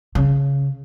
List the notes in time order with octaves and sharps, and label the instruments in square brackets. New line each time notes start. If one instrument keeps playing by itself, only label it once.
[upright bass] C#3